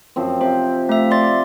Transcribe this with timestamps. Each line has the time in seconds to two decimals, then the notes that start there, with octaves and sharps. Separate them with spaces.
0.16 F#2 F3 C4
0.41 C3 C5
0.89 A3 E5 F5
1.11 D5 E5 C6 D6 A6